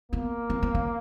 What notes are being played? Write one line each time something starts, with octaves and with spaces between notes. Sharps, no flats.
A#3 B3
C4
C4
C#4